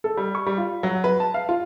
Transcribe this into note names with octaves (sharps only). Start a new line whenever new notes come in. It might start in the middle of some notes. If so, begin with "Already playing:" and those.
A4
G3
C#6
G3
F4
F#3
B4
A5
F5
F4